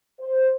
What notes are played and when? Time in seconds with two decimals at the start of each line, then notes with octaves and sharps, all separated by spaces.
0.19 C5